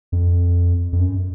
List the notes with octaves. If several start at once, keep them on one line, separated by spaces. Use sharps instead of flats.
F2
F2
F#2